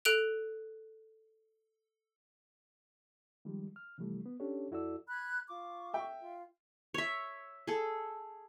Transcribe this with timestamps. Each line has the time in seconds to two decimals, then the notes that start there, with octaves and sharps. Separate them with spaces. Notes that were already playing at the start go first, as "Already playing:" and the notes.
0.05 A4 F#6 D7 F7
3.45 D#3 F3 G3 G#3
3.76 F6
3.98 C3 E3 F3 G3 A3
4.26 B3
4.40 C#4 D4 G4 A4 C#5
4.71 F2 E4 F#4 A4 D5 E6
5.09 B5 F#6 G#6
5.48 F4 C#6 D6
5.94 E5 G5
6.20 F4
6.94 C#5 E5
7.67 G#4 A4